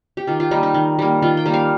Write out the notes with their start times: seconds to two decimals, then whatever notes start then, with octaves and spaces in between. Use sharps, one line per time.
0.17 G4
0.27 D#3 F4
0.40 F4
0.51 G3 A#3 D#4
0.63 D#4
0.74 D#3
0.99 G3 A#3
1.22 D#3 F4
1.37 G5
1.46 G3 A#3
1.54 F5